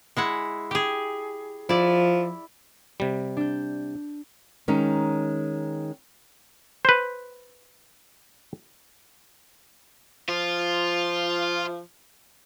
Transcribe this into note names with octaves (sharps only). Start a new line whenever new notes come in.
G#3 E4 F#5
G4 G#4
F3 E4 D5
C3 G3
D4 G6
D#3 G#3 C#4 D#4
B4 C5
F3 F4